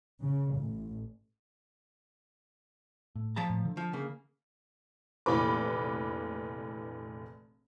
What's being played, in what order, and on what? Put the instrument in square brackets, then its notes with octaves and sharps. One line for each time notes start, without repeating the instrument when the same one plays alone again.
[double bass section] C#3
A1
[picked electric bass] A2
[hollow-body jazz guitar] F3 A5 A#5
[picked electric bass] A2
D3
[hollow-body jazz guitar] F3
C#3 A#3
[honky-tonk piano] F1 A#1 E3 B4 B5 D6